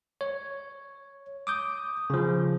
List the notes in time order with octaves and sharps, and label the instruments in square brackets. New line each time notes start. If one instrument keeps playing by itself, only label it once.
[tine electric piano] C#5
D6 D#6 G6
C#3 F3